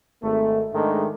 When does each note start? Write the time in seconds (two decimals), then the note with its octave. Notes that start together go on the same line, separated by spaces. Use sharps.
0.22 G#1 A3
0.73 G#2 D#3 G#3 A3 D4